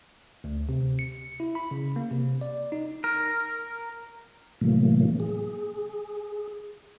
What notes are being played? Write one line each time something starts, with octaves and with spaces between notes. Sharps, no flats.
D2
C3
C#7
E4
B5
C#3
A#3
C3
D5
D#4
A#4
A2 C3 E3 F#3 A3 A#3
G#4